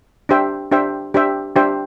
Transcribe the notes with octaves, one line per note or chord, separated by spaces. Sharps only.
D4 G4 C5 E5 G5
D4 G4 C5 E5 G5
D4 G4 C5 E5 G5
D4 G4 C5 E5 G5